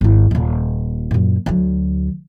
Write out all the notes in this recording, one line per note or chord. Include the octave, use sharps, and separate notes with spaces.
G#1 E4
D#1 A#2
F#2 A#2
D2 F#3